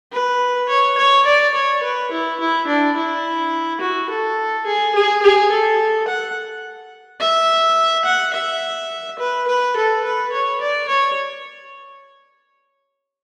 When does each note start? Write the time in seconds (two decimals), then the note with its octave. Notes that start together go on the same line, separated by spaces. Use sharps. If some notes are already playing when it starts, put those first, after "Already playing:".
0.12 B4
0.69 C#5
0.97 C#5
1.26 D5
1.54 C#5
1.83 B4
2.11 E4
2.40 E4
2.67 D4
2.96 E4
3.81 F#4
4.09 A4
4.66 G#4
4.94 G#4
5.22 G#4
5.50 A4
6.08 F#5
7.20 E5
8.05 F#5
8.33 E5
9.19 B4
9.48 B4
9.76 A4
10.04 B4
10.32 C#5
10.60 D5
10.88 C#5